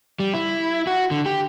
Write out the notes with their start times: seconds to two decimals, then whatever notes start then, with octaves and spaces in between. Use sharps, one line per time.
0.20 G3
0.34 E4
0.87 F#4
1.11 D3
1.26 G4